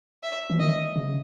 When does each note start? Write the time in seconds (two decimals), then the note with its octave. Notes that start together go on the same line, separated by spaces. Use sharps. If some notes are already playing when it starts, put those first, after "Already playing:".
0.23 E5
0.50 E3
0.59 D#3 D#5
0.96 C#3